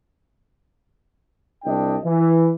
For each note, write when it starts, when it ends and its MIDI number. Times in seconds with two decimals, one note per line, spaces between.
1.64 1.97 36
1.64 1.97 55
1.64 1.97 62
1.64 1.97 75
1.64 1.97 79
2.04 2.52 52